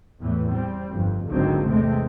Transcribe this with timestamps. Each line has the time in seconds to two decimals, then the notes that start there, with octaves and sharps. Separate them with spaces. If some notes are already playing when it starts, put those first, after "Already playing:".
0.19 E2 A2 E3
0.50 G3 C4
0.91 G1 F2
1.28 G#1 C#2 D3 D#3 F#3 C4
1.67 E2 C3 G#3 A3 C4